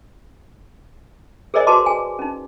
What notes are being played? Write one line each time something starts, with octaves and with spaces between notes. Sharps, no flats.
G#4 A#4 C5 D5 D#5 G#5
F#4 B4 A5 C6 D6
G#4 G#5
C#4 D#4